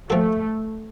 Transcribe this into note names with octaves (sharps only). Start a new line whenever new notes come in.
F3 A3 C4 F#4 A4